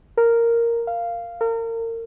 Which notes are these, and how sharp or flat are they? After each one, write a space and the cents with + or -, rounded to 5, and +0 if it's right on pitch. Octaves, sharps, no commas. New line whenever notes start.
A#4 -5
F5 -10
A#4 -35